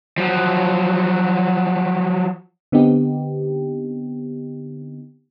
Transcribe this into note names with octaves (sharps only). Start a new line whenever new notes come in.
F3 F#3
D3 B3 C4 D#4 G4